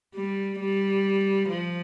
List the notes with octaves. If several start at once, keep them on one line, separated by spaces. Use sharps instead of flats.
G3
G3
F3